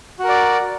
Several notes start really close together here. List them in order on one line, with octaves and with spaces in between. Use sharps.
F#4 A#4 D5